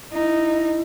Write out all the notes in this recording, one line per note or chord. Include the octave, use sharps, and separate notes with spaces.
D#4 E4